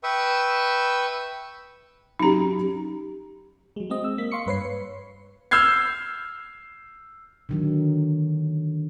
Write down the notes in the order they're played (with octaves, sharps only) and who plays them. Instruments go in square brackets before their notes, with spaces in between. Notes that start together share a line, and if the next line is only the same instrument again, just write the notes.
[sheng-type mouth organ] B4 E5 G5 C#6 D#6 E6
[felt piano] F#3 C#4 G4 [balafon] D#4 A#5
[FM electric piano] F#3 G#3
G#3 C4 D#5
E6
A#3 B6
F5 C6 C#6 C#7
G2 B4 C#5 C7
[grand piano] E6 F6 G6 G#6 C7
[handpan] D3 D#3 F#3